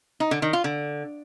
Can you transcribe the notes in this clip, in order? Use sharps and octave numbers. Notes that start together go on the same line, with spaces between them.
D#4
D3
D#3
F4
D3